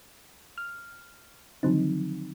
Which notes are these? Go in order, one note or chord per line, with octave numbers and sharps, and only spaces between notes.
F6
D3 D#3 F3 F#3 C4 D#4